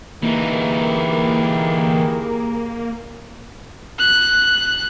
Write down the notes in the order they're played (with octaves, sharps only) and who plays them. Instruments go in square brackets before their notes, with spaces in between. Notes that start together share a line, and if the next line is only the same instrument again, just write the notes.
[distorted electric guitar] E3 D#4 [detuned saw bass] A#3 [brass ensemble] G4 G#4 A#4
[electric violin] F#6